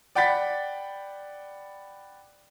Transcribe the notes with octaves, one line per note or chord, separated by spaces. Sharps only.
D5 F#5 G5 B5 A6 B6